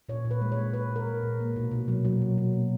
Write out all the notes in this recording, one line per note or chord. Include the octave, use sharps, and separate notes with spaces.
A#2 C#5
A#2
B4
G#3
C#5
G#3
G#3 B4
A#2
A#4
G#3
A#2
A#3
B2
B2
F#3
F#3
B2
F#3
A#3